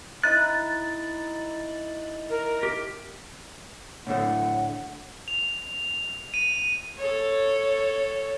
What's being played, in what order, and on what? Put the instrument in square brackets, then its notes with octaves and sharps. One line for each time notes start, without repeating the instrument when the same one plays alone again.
[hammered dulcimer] D#4 E4 D#5 [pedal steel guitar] F#6 [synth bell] A6
[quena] A#4
[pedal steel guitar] G4
[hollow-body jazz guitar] A2 D3 A3 [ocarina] F#5
[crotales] F7
D#7
[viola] A4 C#5